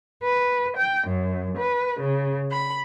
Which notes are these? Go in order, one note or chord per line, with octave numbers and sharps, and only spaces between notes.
B4
G5
F#2
B4
C#3
B5